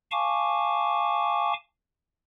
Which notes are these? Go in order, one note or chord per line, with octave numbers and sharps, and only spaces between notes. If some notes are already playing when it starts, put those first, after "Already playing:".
F5 G#5 A5 C#6 D6